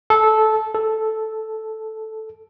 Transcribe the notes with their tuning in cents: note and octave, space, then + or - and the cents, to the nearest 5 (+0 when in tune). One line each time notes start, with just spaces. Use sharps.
A4 -15
A4 -5